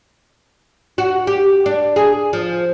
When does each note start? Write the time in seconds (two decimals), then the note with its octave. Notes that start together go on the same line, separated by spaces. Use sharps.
0.98 F#4
1.27 G4
1.66 D4
1.96 G#4
2.33 F3